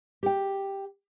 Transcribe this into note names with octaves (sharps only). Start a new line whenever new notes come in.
G4 G5